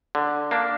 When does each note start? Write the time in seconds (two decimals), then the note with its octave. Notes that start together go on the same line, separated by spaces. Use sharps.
0.15 D3
0.51 A#3 D4